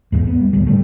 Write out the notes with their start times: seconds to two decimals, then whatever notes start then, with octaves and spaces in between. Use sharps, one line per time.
0.12 E2 G#2
0.27 B3
0.41 G3
0.53 D1 G#1 D2 G3
0.67 G#2 D3 G3 A3